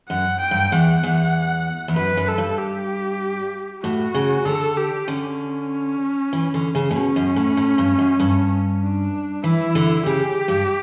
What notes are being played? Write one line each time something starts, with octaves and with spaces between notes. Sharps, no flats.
F#2 F#5
G5
G2
E2 F#5
E2
E2
F#2 B4
F#2
A4
G2
G4
A2 F#4
C#3
D3 A4
G4
D3 C#4
E3
D3
C#3
A2
B2 C#4
F#2
A2
A2
G2
F#2
G2
D4
E3 E4
D3
C#3 G4
G2